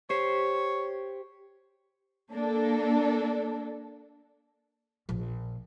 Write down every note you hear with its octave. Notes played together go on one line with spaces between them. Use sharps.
G4 C5 C#5
A#3 D4 A4
A#1